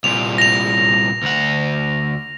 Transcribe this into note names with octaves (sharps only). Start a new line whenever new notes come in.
C2 A#2 F7
A#6 F7
D2 F#5